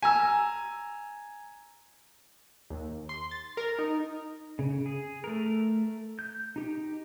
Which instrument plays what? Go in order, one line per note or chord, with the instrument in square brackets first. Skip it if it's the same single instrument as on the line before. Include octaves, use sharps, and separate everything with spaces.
[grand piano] G#5 A#5 E6
[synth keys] D#2
C6
A6
A#4
D#4
[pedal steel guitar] C#3
G#4
A3 A#4
G6
D#4 G4